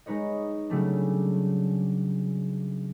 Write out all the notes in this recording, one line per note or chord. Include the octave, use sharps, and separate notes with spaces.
G#3 D#4 B4 C#5 D#5
C#3 F#3 G3 A3 C#4 D4